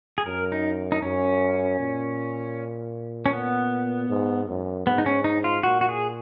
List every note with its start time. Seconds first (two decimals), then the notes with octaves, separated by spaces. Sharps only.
0.18 G#4
0.26 F#2 A#4
0.52 D#4
0.92 D#4
1.02 F#2 C#4
1.80 A#2
3.26 C#4
3.33 B3
4.09 G#2
4.48 F#2
4.86 G#2 B3
4.98 D#4
5.06 C#4
5.24 D#4
5.44 F4
5.63 A#2 F#4
5.81 F#4
5.89 G#4